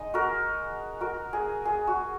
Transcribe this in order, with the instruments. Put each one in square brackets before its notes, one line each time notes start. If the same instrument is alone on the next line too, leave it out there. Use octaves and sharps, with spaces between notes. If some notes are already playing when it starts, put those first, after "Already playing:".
Already playing: [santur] G#3 D#4 D#5
F#4 A#4
F#4 A#4
G#4
G#4
F#4